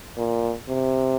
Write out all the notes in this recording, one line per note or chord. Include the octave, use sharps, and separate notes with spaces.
A#2
C3